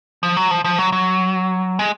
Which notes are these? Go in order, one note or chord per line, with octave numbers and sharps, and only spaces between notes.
F3
F#3
F3
F3
F#3
F#3
G#3